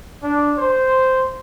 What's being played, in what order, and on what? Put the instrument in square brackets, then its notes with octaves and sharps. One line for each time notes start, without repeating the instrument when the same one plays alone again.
[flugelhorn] D4
C5